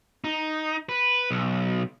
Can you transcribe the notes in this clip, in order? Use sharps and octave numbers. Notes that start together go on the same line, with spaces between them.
D#4
B4
B1